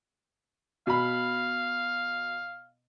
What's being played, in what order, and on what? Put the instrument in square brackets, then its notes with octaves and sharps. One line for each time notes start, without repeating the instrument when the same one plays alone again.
[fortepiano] B2 B5 [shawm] F5